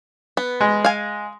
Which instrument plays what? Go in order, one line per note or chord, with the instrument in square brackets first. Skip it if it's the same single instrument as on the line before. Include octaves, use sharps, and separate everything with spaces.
[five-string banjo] B3
[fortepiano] G#3
[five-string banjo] F5 G#5